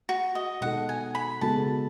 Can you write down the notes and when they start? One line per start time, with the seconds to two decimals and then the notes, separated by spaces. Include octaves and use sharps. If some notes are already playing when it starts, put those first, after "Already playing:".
0.09 F#4
0.35 D#5
0.61 B2 G#3 D#4 F#4 A4 F#5
0.89 G#5
1.15 B5
1.41 C#3 G#3 B3 F#4 A4 A5